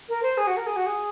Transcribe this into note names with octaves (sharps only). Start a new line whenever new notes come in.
A#4
C5
G#4
F#4
A#4
G#4
F#4
G#4